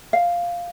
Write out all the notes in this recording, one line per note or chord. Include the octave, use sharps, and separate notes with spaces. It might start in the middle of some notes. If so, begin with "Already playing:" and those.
F5